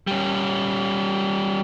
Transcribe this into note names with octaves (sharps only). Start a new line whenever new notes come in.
G3 C#4